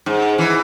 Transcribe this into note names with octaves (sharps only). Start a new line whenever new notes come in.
G#2
E3